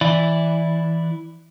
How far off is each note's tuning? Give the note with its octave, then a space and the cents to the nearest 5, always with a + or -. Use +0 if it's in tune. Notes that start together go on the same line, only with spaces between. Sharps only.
E3 -5 E4 +0 D5 +0